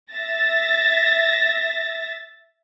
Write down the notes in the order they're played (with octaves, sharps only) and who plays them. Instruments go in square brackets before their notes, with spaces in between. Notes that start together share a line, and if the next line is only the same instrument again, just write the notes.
[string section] E5 A6 A#6